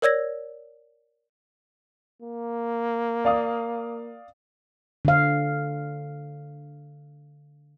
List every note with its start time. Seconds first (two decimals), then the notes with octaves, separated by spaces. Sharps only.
0.02 A#4 C#5 D5 E6 G#6 A#6
2.22 A#3
3.25 D5 F5 D#6
5.05 D3 F5